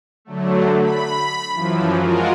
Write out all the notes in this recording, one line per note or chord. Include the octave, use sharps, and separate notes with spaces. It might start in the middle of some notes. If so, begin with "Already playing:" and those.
D3 F#3 A3
B5
F#2 E3 F3
G#3 F4 F#4 A#4